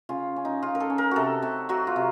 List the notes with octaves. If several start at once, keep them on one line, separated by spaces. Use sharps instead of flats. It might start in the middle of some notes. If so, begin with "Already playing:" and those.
C#3 F4
C#4
D#4
C#3 F4
A#4
A4
C#4
A#4
C3 F#4 A4
C3
F#3 F#4
F4
C3